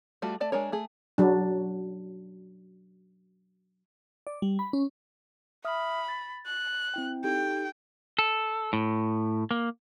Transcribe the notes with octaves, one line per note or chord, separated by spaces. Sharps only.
G3 A3 F4 F#4
A3 D5 A5
G#3 D4 A#4 C#5
A3 G#4
F#3 D4
D5
G3
B5
C#4
E5 B5 D#6 F6
A6
F#6
C4 E4 G5
D#4 G4 A4 G5
A4
A2
A#3